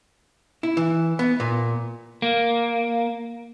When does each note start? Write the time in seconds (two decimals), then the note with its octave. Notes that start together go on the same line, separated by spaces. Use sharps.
0.63 E4
0.77 E3
1.19 B3
1.40 A#2
2.22 A#3